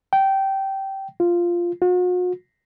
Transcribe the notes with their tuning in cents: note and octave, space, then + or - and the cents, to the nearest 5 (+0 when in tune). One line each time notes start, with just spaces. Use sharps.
G5 -15
F4 -5
F#4 -45